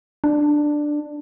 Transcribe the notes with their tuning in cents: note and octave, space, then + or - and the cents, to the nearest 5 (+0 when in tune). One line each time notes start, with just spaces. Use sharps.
D4 +10